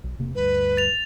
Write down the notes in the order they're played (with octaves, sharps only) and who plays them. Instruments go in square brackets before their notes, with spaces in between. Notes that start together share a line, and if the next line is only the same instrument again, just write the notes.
[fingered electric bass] B1
E1 C3 A#3
[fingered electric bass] D2 G2 [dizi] B4
[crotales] A6 F7